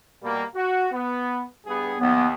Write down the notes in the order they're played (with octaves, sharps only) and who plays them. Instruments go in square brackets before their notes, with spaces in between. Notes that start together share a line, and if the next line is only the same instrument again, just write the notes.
[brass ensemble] B2 G3 A#3
F#4
B3
G2 B3 G#4
[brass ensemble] D#2 [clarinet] B3